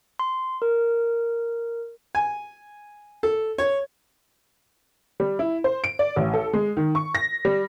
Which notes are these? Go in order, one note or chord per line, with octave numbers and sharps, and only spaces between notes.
C6
A#4
G#5
A4
C#5
G3
E4
C5
D7
D5
A1
A4
G#3
D#3
C#6
A#6
G3